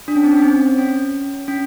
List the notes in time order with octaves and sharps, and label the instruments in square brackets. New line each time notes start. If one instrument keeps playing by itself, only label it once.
[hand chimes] D4
C#4
C4
C#4
C4
C#4
C#4